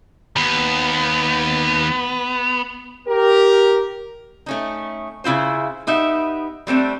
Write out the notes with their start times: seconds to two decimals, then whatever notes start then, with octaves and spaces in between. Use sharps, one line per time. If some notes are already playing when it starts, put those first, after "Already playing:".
0.36 D#2 B3
3.07 G4 A#4
4.46 A3 C#4 D#4
5.24 C#3 E4 F4 C5
5.87 B3 D#4 G4 E5
6.67 G3 A3 C4 D4